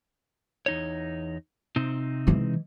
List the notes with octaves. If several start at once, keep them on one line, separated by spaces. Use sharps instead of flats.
E2 D#4 C#5
C3 C4 D#4
E3 G#3